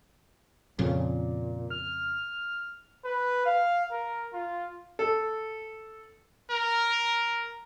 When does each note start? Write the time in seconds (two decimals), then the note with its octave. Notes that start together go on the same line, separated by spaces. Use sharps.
0.79 F2 A#2 C#3
1.70 F6
3.05 B4
3.46 F5
3.92 A#4
4.33 F4
4.99 A4
6.51 A#4